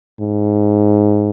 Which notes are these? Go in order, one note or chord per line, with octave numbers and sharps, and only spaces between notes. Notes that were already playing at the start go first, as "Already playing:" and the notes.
G#2